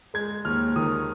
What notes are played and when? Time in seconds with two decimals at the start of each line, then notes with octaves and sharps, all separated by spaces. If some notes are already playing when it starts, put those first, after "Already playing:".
0.14 G#3 G#6
0.45 D#2 F6
0.76 D#3 D#6